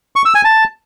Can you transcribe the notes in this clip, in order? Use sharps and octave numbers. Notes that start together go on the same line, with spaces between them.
C#6
E6
G#5
A5